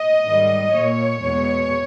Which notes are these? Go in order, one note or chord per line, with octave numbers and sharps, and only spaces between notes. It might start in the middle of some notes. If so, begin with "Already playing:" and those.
Already playing: D#5
G#2 D#3 G3
A#2 A#3 C#5
E2 B2 G#3